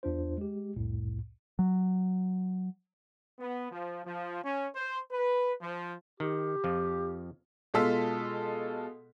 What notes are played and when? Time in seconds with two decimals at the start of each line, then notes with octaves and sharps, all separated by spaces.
0.03 E2 D4 F4 C5
0.38 G#3 G4
0.76 C2 F2 A2
1.59 F#3
3.39 B3
3.72 F3
4.05 F3
4.44 C#4
4.75 C5
5.12 B4
5.61 F3
6.20 D#3 G4
6.64 F2 F3
7.74 B2 G#3 F4 A4 E6 B6